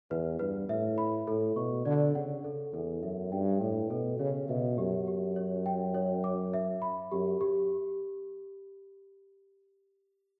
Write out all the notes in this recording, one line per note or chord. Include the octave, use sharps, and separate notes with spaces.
E2 B4
G2 B4
A2 E5
B5
A2 A4
B2 C#6
D3 D5
C#3 F#5
A4
E2 A4
F#2 E5
G2 G5
A2 A4
B2 A4
C#3 C#5
B2 E5
F#2 G4
G4
C#5
G5
C#5
D6
E5
B5
F#2 G4
G4